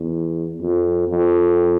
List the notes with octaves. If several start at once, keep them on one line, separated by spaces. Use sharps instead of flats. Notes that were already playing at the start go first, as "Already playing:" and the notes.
Already playing: E2
F2
F2